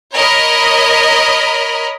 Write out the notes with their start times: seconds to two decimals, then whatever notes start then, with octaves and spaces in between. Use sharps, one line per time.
0.14 A#4 C#5 D#5 B5